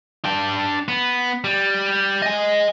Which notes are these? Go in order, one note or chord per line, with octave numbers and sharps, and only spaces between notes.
D4 G5
B3
G3
D#5 G#5